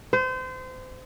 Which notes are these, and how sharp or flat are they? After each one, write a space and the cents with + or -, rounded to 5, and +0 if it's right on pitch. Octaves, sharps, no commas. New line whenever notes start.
C5 -30